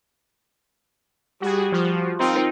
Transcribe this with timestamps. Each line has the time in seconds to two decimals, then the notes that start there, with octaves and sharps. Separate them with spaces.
1.42 G3 F#4 G#4
1.72 F3 F4 F#4
2.20 C4 D#4 F4 A#4